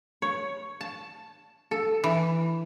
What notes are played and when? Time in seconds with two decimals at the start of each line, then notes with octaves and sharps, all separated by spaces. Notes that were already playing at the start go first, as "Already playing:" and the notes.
0.22 C#5
0.81 A5
1.71 A4
2.04 E3